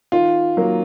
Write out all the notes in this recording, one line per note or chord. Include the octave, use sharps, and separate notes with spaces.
D#3 F4
F#3 A#3